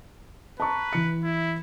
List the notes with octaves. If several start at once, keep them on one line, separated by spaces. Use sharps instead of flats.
B4 A5 A#5 C#6
E3 C#7
E4